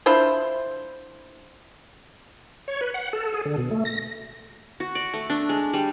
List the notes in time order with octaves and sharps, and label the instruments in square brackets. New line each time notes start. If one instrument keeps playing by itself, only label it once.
[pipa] D4 E4 F4 C5
[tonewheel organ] C#5
B4
F#5
A4
G#4
D3
B2
A3
A#6
[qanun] F#4
D5
A3
D4
G#3
G3